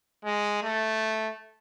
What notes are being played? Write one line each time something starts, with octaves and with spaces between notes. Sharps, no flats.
G#3
A3